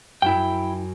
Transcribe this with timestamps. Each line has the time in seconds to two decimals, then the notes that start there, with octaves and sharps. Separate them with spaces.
0.22 F#2 E4 G5